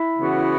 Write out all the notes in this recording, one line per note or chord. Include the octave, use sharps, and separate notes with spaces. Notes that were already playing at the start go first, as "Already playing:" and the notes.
Already playing: E4 E5
C#3 E3 B3 F#4